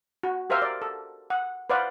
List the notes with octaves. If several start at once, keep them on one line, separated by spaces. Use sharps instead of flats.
F#4
G4 A#4 C5 E5 F5
D5
A4
F#5
B4 C5 D5 F5 F#5